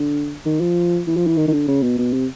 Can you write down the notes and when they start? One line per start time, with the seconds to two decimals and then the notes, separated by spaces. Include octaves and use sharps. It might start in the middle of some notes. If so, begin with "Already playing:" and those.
Already playing: D3
0.46 D#3
0.61 F3
1.07 E3
1.17 F3
1.27 E3
1.37 D#3
1.48 D#3
1.53 D3
1.68 C#3
1.83 B2
1.98 B2
2.13 C3